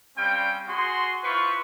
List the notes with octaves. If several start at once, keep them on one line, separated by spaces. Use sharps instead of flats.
G3 C4 C#4 F5 G5
F#4 G#4 C6
E4 F4 B4 C5 C#6